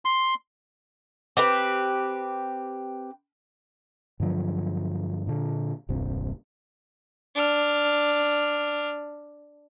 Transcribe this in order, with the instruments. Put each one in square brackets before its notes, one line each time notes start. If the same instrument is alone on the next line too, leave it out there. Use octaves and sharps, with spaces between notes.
[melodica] C6
[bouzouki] C4 G4 B4
[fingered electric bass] G2 D3 F3 F#3
A#2 D3
D#1 C2 G2 C3
[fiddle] D4 F6